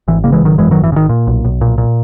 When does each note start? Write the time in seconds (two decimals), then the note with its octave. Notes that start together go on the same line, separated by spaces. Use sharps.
0.08 G#1 E3
0.24 C#3 A#3
0.32 E3 G#3
0.41 G#1 D#3 F#3
0.58 F#2 E3 G#3
0.71 D#3 F#3
0.75 G#1
0.84 E3
0.92 C#3
0.96 D#3
1.09 A#2
1.27 B1
1.45 B1
1.61 A#2
1.78 A#2